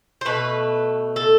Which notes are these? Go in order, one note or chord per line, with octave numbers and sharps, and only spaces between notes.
C5
B2 A3 B4
A4